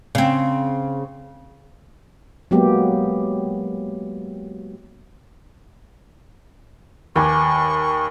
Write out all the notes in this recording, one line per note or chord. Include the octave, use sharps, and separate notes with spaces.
C#3 C4
F#3 G#3 A#3 B3 G4
D#2 B4 G#5 C#6 D6